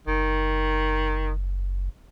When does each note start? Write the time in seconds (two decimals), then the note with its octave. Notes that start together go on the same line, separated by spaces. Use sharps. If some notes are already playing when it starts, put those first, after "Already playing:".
0.07 F#1 D#3